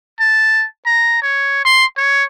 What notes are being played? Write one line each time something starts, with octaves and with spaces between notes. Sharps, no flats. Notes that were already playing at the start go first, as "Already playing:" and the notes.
A5
A#5
C#5
C6
C#5